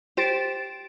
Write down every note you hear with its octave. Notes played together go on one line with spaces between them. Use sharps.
G4 C5 A6 D7 E7